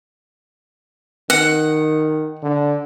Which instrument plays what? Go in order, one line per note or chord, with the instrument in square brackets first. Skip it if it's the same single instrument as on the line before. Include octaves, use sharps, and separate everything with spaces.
[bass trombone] D#3 [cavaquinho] F#5
[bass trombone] D3